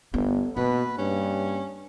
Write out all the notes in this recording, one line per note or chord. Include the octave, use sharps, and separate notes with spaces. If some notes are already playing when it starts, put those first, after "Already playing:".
G1 B3
B2 A#3 B4
G2 C#4